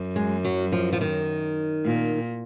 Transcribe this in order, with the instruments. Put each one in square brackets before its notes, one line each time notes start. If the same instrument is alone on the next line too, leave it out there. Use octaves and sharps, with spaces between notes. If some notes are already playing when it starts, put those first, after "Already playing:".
Already playing: [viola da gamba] F#2
[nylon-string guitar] G#3
F#3
F3
F3
D#3
[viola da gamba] A#2